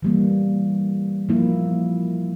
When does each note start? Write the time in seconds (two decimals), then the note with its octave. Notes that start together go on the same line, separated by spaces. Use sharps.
0.02 E3 G3 A#3
1.29 F3 A#3 E4